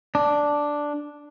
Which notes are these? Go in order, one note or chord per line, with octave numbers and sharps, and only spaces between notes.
D4